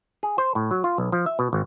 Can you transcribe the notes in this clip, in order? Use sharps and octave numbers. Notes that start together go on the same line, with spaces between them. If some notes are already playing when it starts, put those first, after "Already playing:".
G#4
C5
A2
F#3
F4
B1
F3
E5
B2
G#1